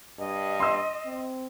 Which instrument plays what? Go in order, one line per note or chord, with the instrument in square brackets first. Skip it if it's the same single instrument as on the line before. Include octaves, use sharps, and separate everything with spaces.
[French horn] G2 [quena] D#5
[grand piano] C6 E6
[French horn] C4